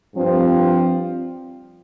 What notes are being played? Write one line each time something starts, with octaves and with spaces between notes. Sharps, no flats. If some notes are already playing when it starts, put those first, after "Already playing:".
G2 F3 C4